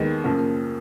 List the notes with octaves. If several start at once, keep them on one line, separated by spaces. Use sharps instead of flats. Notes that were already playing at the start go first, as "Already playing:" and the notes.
Already playing: D#2 D#3 G#3 B3
F#2 C#3 F3 A#3